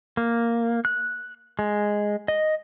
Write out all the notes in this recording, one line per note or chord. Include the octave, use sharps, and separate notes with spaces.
A#3
F#6
G#3
D#5